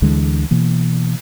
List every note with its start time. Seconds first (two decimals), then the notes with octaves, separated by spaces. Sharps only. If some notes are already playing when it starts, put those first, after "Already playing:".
0.02 D2 D3 E3 G#3
0.51 B2 E3 A#3